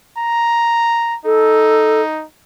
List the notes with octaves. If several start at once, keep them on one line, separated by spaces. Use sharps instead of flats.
A#5
D#4 A4